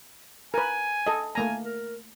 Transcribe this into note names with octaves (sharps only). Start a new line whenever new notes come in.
A#4 B4 G#5
A4 D#5
A3 A#3 G#5 A#5
A#4